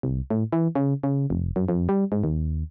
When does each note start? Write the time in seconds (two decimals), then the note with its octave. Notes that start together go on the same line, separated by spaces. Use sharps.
0.03 C2
0.30 A2
0.53 E3
0.75 C#3
1.03 C#3
1.30 F1
1.56 F#2
1.68 F2
1.89 G3
2.12 G#2
2.24 D#2